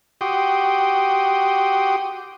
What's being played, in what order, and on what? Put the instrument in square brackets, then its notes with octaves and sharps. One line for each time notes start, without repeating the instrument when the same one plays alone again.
[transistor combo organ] F#4 G4 G5 C6 D#6